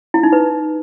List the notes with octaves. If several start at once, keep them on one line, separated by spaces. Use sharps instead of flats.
E4
D#4
B4